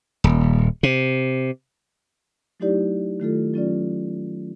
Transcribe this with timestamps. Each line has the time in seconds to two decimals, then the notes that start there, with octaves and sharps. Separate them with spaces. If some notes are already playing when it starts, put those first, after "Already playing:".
0.24 D#1
0.83 C3
2.60 F#3 A3 D#4 E4 G4 D5
3.20 D#3 A3 F4 A4
3.54 F#3 C#4 F4 D5